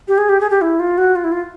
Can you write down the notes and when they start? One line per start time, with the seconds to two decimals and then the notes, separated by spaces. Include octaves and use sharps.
0.08 G4
0.18 G#4
0.29 G4
0.41 G#4
0.50 G4
0.61 E4
0.80 F4
0.98 F#4
1.16 F4
1.24 E4
1.32 F4